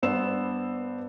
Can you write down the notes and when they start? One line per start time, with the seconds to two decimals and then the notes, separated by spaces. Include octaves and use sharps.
0.03 G2 B3 C5 D5 E6 E7